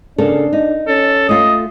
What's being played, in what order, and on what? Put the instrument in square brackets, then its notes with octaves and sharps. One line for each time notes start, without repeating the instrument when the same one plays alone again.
[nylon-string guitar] C#3 A#3 A4 [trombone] D4
[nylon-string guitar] D#4
[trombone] C#4 [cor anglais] A4
[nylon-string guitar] A3 F4 [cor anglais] D#5